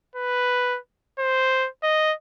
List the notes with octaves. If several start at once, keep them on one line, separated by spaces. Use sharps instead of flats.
B4
C5
D#5